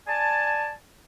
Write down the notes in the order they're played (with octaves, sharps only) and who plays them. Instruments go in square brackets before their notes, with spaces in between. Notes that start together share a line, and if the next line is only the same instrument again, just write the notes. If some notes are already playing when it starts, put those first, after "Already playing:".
[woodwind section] D5 G#5 A5